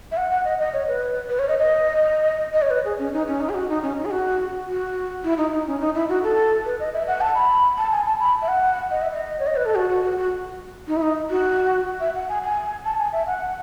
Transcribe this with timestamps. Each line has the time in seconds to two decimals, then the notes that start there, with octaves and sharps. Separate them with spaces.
0.12 E5
0.17 F#5
0.31 F#5
0.45 D#5
0.59 D#5
0.74 C#5
0.88 B4
1.29 B4
1.39 C#5
1.49 D#5
1.59 D#5
2.54 D#5
2.62 C#5
2.70 B4
2.85 G#4
2.99 C#4
3.13 D#4
3.27 C#4
3.41 D#4
3.49 G#4
3.55 F#4
3.69 D#4
3.83 C#4
3.98 D#4
4.05 G#4
4.11 F#4
4.67 F#4
5.24 E4
5.38 D#4
5.53 D#4
5.67 C#4
5.81 D#4
5.95 E4
6.09 F#4
6.23 A4
6.66 B4
6.80 D#5
6.93 E5
7.08 F#5
7.21 A5
7.35 B5
7.77 A5
7.92 G#5
8.06 A5
8.20 B5
8.42 E5
8.48 F#5
8.91 D#5
9.02 E5
9.12 D#5
9.39 C#5
9.47 D#5
9.56 B4
9.66 A4
9.75 F#4
9.89 F#4
10.03 F#4
10.17 F#4
10.88 D#4
10.96 E4
11.02 D#4
11.30 F#4
12.00 E5
12.15 F#5
12.29 G#5
12.43 G#5
12.85 A5
12.99 G#5
13.13 E5
13.27 F#5